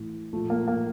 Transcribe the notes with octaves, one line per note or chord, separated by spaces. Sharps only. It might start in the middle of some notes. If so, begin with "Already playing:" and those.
Already playing: A2 E3
A#2 F3 A3
A#3
A#3